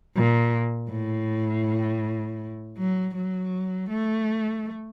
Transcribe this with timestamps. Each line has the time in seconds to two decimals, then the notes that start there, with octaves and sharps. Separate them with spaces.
0.17 A#2
0.91 A2
2.78 F#3
3.16 F#3
3.90 A3